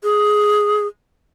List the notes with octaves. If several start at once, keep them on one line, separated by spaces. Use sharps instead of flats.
G#4